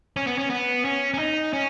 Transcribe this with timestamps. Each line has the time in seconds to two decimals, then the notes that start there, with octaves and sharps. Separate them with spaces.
0.16 C#4
0.27 B3
0.38 C#4
0.50 B3
0.85 C#4
1.14 C#4
1.18 D#4
1.53 C#4